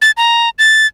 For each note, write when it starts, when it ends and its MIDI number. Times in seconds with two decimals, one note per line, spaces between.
0.02 0.11 93
0.17 0.50 82
0.59 0.87 93